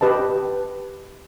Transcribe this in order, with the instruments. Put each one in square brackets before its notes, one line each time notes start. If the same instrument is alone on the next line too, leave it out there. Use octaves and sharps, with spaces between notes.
[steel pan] G4 B4 D#5 A5